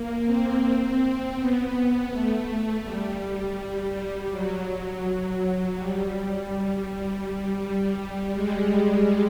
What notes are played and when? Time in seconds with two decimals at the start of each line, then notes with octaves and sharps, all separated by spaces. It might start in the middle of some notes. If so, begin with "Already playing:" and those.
Already playing: A#3
0.26 C4
0.99 C4
1.37 B3
1.73 B3
2.10 A3
2.84 G3
3.94 G3
4.30 F#3
5.03 F#3
5.76 G3
6.13 G3
6.50 G3
7.23 G3
7.60 G3
8.34 G#3